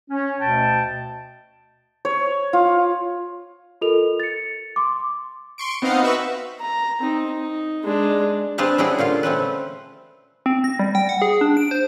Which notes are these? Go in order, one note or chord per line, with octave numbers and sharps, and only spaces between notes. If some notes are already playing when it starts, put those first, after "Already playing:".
C#4
D2 B2 G5 A5
C#5
F4
F4 A4 A#4 D#5 F7
A6 C#7
C6 D6
C6 C#6 D7
B3 C4 D#4 D#5 F5 F#5
F#4 B4 E5 B5 C#6
A#5
C4 D#4
D#4
G#3 D4
C4 D4 G#4 B4 F5 A5
G3 C#4 D4 E4 F#4 G#4
A#2 D3 F4 F5
A3 C4 C#4 B4
C4
A#6
G3
G5
F#5
G#4
D4
D7
C5